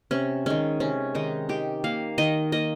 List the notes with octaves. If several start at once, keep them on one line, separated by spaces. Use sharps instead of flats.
C3 C#4
D#3 G#3 C#4
C3 C#4
D#3 G#3 D#4
D#3 G4
A#3 F5
D#3 D#5
A#3 D#5